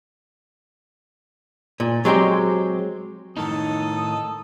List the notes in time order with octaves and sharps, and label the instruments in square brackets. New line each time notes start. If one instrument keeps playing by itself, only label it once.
[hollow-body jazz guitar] A#2
F#3 G#3 C4 G4
[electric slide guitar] A2 D#3 D#4 [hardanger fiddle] A4 [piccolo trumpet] D#6